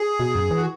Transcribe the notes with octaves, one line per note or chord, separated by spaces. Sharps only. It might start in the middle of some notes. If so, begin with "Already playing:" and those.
Already playing: G#4
B2
F#2
E3
F#4